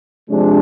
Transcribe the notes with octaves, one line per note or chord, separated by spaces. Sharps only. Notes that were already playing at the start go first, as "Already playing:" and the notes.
C3 F3 G#3 D4